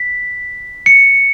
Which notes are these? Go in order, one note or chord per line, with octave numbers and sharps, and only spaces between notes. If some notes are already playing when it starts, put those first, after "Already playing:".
Already playing: B6
C#7